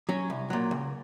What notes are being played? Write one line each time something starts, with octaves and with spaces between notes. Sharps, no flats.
F#3 C#4
C2
A#2 F#3
C#2